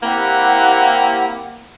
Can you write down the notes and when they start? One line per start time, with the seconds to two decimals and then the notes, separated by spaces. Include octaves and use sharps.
0.03 A#3 C4 E4 G4 F#5